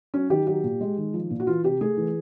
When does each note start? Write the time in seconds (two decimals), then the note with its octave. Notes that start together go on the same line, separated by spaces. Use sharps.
0.14 F#3 C#4
0.30 D#3 G4
0.47 F#3 G4
0.64 A#2
0.81 G#3
0.97 D#3
1.14 F3
1.30 A#2
1.40 F#4
1.47 E3 F4
1.64 C3 G4
1.81 A3 G#4
1.97 E3